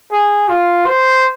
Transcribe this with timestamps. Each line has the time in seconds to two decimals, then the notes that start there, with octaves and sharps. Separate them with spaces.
0.11 G#4
0.49 F4
0.86 C5